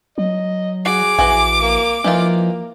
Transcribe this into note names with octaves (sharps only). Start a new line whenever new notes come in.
F#3 D#5
F#4 G#4 D6
A#1 E3 F#4 G#5
A#3
E3 F3 A#3 D#4 F4